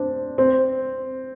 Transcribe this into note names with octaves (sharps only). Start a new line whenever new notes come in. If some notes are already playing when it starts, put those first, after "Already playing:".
Already playing: C4 D4
C4